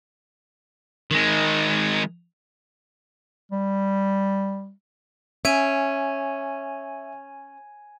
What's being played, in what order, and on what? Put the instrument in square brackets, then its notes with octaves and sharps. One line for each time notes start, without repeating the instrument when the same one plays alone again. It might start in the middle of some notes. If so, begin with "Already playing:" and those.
[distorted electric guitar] D#3 G#3
[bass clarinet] G3
[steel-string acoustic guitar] C#4 [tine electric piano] E5 [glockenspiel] G#5 G#6 D#7